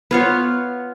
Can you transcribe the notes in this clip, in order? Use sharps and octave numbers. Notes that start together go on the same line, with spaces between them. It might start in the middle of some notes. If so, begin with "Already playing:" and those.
B3 F4 C#5